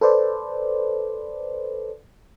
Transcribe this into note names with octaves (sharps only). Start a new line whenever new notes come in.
A4 B4 C5 D5